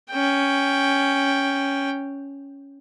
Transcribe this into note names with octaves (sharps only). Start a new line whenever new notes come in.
C#4 G5